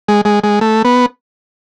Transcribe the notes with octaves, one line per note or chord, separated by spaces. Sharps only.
G#3
G#3
G#3
A3
B3